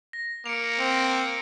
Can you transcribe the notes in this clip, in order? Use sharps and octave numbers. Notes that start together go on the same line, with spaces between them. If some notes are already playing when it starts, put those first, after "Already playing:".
A#6
A#3 C#7 D7 F7
C4